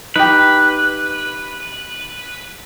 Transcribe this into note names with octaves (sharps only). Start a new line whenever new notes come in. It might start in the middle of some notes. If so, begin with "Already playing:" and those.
D#4 G4 B4